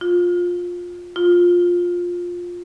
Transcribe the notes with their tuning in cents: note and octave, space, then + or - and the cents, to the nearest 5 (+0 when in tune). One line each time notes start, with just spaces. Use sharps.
F4 +15
F4 +10